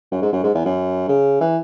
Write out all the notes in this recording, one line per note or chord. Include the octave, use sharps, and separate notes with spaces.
F#2
G#2
F#2
G#2
E2
F#2
C#3
E3